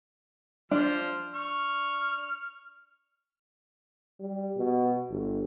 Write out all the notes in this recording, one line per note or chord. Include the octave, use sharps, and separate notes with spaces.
F3 D4 C5 F6
C#6 F6
G3
B2
G1